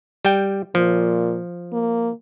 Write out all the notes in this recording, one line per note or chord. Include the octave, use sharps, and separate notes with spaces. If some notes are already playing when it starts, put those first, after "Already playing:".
G3 G5
A#2 F3
A#3